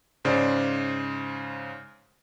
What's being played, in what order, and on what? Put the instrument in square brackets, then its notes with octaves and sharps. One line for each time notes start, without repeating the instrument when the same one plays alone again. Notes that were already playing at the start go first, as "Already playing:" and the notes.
[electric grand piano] G#2 C#3 C5 D5